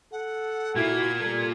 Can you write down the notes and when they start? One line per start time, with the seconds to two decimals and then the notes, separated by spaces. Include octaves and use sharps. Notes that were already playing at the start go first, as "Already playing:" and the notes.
0.12 A4 F#5
0.76 A#2 A#3 E4 F#4 G#6
1.20 G3 A4 A#4